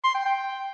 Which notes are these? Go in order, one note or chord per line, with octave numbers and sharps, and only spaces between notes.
C6
G5
G5